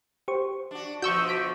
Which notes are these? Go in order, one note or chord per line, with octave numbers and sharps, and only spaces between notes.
G4 C5 C#6
D4 F#4
B2 D3 F3 F#4 C#6 E6 G6
D6 B6 D7